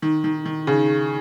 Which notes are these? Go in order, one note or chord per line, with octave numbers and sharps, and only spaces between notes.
D#3
D#3
D#3
C#3